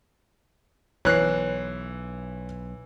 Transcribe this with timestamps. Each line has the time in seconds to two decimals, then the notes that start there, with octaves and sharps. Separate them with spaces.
1.05 B1 E3 C#5 F#6 C7